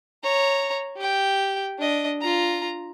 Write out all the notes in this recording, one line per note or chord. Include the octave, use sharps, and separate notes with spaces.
C#5 A#5
G4 G5
D4 D#5
F4 A#5